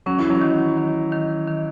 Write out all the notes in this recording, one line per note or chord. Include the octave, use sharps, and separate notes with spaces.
F#3 C#4
E3
F#3
D#3
D#3
D#3
D#3